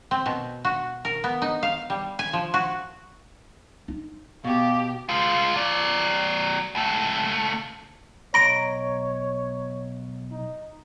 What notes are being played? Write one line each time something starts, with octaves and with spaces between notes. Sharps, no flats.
C4
B2
F#4
A#4
B3
D#4
F5
G3
G#5
F3
F#4
D#4
B2 G4 F5
G#3 F4
F#3 D5
C#2 A3
B1 C#5 A#5 A#6 D7
D#4